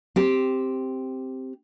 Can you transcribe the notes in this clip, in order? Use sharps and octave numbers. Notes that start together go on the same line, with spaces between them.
C4 G4